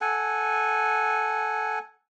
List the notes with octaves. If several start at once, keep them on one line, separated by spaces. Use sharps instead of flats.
A4 F#5 G#5